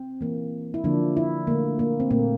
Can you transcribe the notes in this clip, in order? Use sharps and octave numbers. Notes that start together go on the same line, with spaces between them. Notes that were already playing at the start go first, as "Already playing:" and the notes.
Already playing: C4
E3 A#3
E4
D3 F3 A#3 D4
E4
D3 A3 A#3
A#3
C4
A#2 A3 A#3